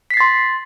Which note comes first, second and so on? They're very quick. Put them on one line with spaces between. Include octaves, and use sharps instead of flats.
B6 C7 A6 C6